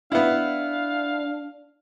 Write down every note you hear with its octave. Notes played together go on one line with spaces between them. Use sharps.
B3 D4 E4 F5